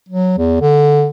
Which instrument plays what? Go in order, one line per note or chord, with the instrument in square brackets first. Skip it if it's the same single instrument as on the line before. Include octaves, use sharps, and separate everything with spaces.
[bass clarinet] F#3
E2
D3